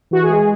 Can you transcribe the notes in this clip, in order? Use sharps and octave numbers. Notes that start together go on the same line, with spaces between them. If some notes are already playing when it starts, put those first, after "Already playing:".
E3 F#4
G#4
G#3